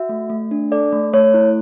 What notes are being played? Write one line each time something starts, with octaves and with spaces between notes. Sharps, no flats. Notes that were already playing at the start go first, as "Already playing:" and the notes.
Already playing: F#4 E5
A3
A3
D4
A4 D5
A3
A3 C#5
E4